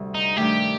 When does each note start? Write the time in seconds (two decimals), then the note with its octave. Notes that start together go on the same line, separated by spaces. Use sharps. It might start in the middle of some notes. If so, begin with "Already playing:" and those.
Already playing: D2 C3 G3
0.14 D#4
0.36 G2 D#3 A3 G4